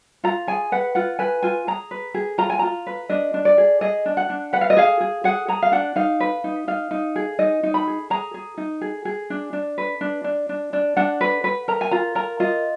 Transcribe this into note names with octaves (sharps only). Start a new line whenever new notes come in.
F4 A#5
G#4 G#5
B4 F#5
F4 F#5
B4 G#5
F4 G#5
G#4 A#5
B4
G#4
F4 A#5
G#5
F4 A#5
B4
D4 D#5
D4
D5
G#4
G#4 D#5
D4
F#5
D4
B4 F#5
F5
D#5
G#4 F5
G#4
G#4 F#5
G#4 A#5
F5
D4 F#5
D#4 F5
B4
D#4
D#4 F5
D#4
G#4
D#4 D#5
D#4
B5
G#4
G#4 A#5
G#4
D#4
G#4
G#4
D4
D4
B4
D4
D4
D4
D4
D4 F#5
B4
B4
A#4 A#5
G#5
F4 A#5
A#4 A#5
F4 D#5